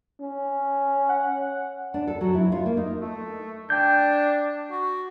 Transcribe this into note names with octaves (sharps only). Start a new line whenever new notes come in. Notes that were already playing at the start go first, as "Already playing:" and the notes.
C#4
F#5
D4
A4
F#3
E4
F4
A#3
D#4
A3
D4 G5 G6
F#4